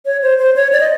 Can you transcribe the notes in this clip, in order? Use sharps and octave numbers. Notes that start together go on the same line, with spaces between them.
C#5
C5
C5
C#5
D5
D#5